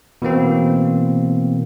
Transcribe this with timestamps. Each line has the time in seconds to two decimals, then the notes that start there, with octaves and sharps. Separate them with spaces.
0.22 B2 E3 A#3 C4